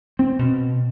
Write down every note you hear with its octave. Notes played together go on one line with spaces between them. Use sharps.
C4
B2